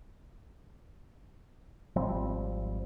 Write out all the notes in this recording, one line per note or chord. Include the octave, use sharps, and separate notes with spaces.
G#1 F3 G3 C4